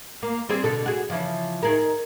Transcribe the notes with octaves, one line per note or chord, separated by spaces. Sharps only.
A#3
G3 C4 G#4
B2 D3 A4
F#4 G#4
C#3 E3 F3
D#3 G#4 A#4